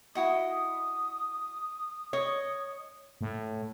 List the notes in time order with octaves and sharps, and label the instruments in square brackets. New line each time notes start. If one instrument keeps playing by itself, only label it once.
[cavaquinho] E4 F#4 D#5 [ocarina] D#6
[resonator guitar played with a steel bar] C#5 [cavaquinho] D#5
[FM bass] A2